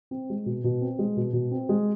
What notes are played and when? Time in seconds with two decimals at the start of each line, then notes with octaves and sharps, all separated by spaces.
0.11 C4
0.30 G#3
0.46 B2
0.64 B2
0.81 C4
0.99 G#3
1.17 B2
1.33 B2
1.51 C4
1.69 G#3